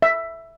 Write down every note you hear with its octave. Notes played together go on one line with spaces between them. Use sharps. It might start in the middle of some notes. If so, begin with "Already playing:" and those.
E5